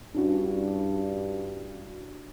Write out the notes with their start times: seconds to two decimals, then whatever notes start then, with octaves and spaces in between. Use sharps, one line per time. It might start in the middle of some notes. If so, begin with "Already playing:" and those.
0.15 G2 C#4 D4 E4 F#4